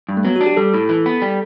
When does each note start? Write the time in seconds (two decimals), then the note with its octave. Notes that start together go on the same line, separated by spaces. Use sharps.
0.09 G2
0.17 A3
0.24 F#3 B3
0.36 F#4
0.41 D4
0.46 G4
0.57 G3 A4
0.74 A2
0.89 E3
1.06 B3
1.22 G3